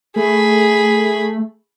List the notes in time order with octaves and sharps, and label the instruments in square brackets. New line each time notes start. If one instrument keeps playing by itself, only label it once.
[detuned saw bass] A3 [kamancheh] G#4 B5